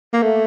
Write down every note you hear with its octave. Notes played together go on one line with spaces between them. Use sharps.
A#3
A3